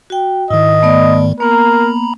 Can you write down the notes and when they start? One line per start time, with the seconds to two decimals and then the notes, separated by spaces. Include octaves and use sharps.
0.10 F#4 G5
0.50 G#2 D#3 E4 D#5
0.82 A3 B3 D5
1.40 A#3 B3 A#4 A#5 B5